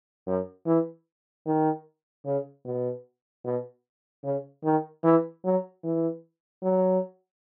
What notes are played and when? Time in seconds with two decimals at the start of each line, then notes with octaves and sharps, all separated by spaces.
0.27 F#2
0.66 E3
1.46 D#3
2.25 C#3
2.65 B2
3.44 B2
4.24 C#3
4.64 D#3
5.04 E3
5.44 F#3
5.83 E3
6.63 F#3